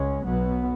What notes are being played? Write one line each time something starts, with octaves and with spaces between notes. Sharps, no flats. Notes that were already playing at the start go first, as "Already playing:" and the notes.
Already playing: C#2 G#3 C#4
B1 B2 F#3 B3